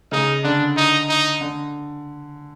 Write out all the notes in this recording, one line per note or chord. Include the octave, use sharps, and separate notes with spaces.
C#3 D#4
D3 D4
D#4
D#4
D3